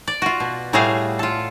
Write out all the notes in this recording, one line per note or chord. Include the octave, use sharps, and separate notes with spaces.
D5
F4 F#4
B2
A2 G3 A3 F#4 G#4 F5
F4 A4